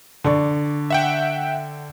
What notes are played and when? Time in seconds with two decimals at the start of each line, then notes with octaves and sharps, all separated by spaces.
0.24 D3 D5 C#6
0.90 E5 F#5 G5